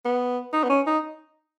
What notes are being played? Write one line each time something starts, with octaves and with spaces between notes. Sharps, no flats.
B3
D#4
B3
C#4
D#4